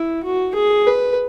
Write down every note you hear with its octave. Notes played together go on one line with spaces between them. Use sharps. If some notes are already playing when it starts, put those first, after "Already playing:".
Already playing: E4
F#4
G#4
B4